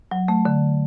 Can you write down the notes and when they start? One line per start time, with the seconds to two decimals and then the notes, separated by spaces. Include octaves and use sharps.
0.11 F#3
0.28 A3
0.45 D3